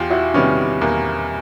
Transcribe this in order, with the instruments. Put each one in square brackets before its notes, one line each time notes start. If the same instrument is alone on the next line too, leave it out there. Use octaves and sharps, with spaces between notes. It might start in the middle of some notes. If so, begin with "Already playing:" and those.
Already playing: [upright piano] E2 [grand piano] F4 G4
[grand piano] E4 F#4
[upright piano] C3 D#3 G3 [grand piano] B3 C#4
[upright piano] E2 [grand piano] A#3